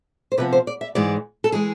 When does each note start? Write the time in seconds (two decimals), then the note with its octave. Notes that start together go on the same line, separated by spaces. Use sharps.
0.32 C5
0.38 C3 F3 B3 B4
0.53 C5
0.67 D5
0.81 E5
0.95 G#2 E3 G#3 D5
1.44 A4
1.52 E3 G#3 G#4